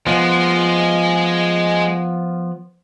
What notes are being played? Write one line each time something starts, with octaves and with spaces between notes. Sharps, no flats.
F3 G#3 B3